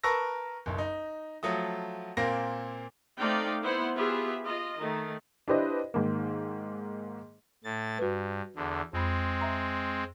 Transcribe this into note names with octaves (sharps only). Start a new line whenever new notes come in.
A#4 B4 A5 C#6 E6 A#6
F#1 B1
D#4
F3 F#3 A3 D#6
A#2 A#3 C4 A#6
A3 C4 D#4 D5 F5 G5
B3 E4 C5 F#5
B3 F4 G4 G#4 B4 E5
F4 D#5
D#3 A3
D4 E4 G4 B4 C5 D#5
G#2 D#3 A#3
A2 A6
G2 F#4 B4
E2 D3
F2 G#3 C4 B5
E5 A#5